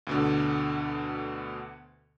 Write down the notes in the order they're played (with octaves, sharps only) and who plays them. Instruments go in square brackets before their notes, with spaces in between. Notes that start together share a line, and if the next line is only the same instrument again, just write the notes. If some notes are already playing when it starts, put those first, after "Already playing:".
[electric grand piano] D2 B2 D3